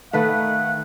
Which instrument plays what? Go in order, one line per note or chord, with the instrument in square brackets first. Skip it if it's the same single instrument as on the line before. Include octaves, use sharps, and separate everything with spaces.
[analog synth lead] D#3 [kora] A3 B4 [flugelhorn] F5 [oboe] F#5